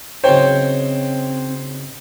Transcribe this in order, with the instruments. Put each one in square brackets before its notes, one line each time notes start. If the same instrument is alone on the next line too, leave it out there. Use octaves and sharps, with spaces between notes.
[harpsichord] C#3 F#3 D#4 [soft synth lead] C4 [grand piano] C5 C#5 G5